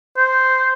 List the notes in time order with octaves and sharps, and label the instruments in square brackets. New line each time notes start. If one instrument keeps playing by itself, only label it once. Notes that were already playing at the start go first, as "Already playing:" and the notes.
[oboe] C5